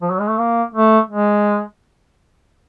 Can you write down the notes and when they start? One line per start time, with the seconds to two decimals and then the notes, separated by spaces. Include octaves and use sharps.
0.02 F3
0.11 F#3
0.20 G#3
0.29 A3
0.38 A#3
0.74 A3
1.10 G#3